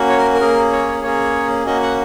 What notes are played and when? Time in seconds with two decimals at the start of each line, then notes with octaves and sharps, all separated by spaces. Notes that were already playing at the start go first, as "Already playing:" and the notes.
Already playing: A#3 C#4 F#4
0.09 C#5
0.18 A#4
0.34 A#4
0.40 A#3 C#4 G#4
0.72 C#5
1.03 A#3 C#4 G#4 C#5
1.66 A#3 C#4 F#4 D#5
1.82 F#5